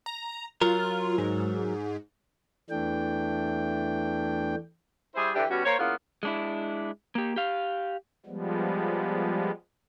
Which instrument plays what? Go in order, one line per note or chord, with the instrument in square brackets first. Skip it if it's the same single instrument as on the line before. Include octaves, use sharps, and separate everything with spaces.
[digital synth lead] A#5
[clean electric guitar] F#3 A#4 [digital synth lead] F4
[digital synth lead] G#2
[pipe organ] E2 E3 A3 D4 G5
[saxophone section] G3 E4 G#4 C5
D3 E3 D4 G4
B2 G3 C#4 F#4
A#3 C5 C#5
C#3 A#3 B3 E4 F4
[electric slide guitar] G#3 D4 E4
A#3 G4
G4 F5
[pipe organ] F3 G3 G#3 B3